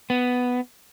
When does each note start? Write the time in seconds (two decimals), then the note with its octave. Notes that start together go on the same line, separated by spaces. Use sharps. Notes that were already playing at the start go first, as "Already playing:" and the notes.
0.10 B3